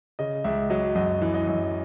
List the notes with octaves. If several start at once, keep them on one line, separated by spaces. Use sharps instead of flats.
C#3 D#5
C#2 E5
F#3 D#5
F#2 D#5
E3
D#5
F#2